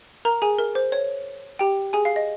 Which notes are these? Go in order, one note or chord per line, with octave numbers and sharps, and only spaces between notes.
A#4 A#5
G#4 G#5
A#4
C5
C#5
G4 G5
G#4 G#5
F5
D#5